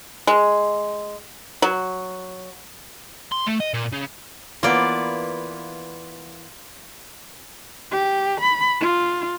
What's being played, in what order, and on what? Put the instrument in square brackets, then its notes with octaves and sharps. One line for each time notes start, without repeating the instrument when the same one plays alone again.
[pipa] G#3
F#3
[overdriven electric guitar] C6
A3
D#5
A#2
C#3
[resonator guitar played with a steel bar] E3 A#3 B3 [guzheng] F4 D5
[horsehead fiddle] G4
B5
F4